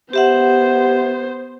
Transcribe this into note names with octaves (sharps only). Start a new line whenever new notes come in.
B3 G4 C5 E5 F#5